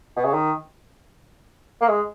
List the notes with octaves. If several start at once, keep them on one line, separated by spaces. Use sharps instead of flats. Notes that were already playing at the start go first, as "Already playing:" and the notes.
B2
C#3
D#3
A#3
G#3